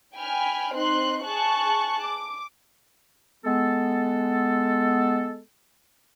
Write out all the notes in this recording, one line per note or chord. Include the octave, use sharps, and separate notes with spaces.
G5 G#5 B5 F6
C4 D#4 C6 F#6
G#4 A5 C#6 F#6
D6
G#3 B3 A4